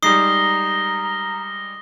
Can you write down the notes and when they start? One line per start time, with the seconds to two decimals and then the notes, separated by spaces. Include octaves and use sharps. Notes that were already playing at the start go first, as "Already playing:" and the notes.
0.03 G3 G#3 D#4 A#5 D#6 A#6 C7 G7